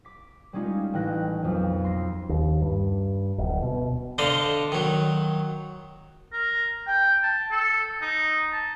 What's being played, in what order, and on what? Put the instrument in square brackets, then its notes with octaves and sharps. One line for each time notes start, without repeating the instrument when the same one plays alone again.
[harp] D6 B6
G3 G#3 C#4 D#4 F4
A1 G5 F#6 A#6
B1 F2
C6 A#6
[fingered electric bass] D#2
G2
D1
B2
[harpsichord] D3 C5 D5 D#5 F5 C6
D#3 F#3
[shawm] A#4
G5
A5
A4
D#4
A5